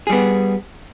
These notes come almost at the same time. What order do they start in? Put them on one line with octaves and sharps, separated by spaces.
G#4 G3 B3